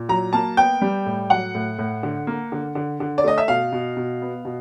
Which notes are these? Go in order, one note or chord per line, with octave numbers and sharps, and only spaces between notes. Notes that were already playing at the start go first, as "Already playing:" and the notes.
Already playing: A#2
F#3 A#5
A#3 A5
B3 G5
G3
A2
F#3 F#5
A2
A2
D3
A#3
D3
D3
D3
D5
A3 D#5
E5
B2 F5
B2
B2
B3
B2